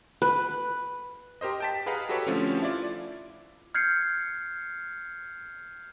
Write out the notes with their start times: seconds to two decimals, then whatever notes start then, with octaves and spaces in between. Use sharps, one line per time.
0.22 B4
1.41 G4 A#4 C5 D#5
1.60 G5 A5 B6
1.86 G#4 B4 D#5 F5 F#5 A#5
2.09 F#4 G4 A4 B4 C#5
2.27 D3 F3 A3 C4 C#4
2.62 E4 F4 D5
3.75 F6 G6 G#6 C7 C#7